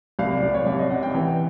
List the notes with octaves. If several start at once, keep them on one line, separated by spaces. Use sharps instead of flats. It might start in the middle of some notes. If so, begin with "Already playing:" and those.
C2 F5
D5
C2 D5
C#5
C2 D5
D#5
C3 F#5
G5
E3